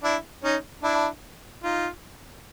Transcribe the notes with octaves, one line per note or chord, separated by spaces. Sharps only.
D4 E4
C#4 D#4
D4 E4
D#4 F4